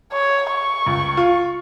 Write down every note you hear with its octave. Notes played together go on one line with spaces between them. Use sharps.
C#5
C#6
C#2
F4